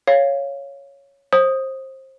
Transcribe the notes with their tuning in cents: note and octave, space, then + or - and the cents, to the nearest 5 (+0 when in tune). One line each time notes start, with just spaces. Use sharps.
C#5 +0 F5 -5
C5 +25 D#6 +0